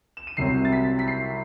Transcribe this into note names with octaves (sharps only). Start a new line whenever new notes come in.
E7
D#7
C2 C3 F#3 C4 C7
A6
B6
B6
C7